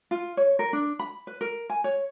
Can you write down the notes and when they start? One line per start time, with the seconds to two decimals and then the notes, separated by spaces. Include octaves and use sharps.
0.11 F4
0.37 C#5
0.59 A#4
0.73 D4
0.99 B5
1.27 B4
1.41 A#4
1.70 G#5
1.84 C#5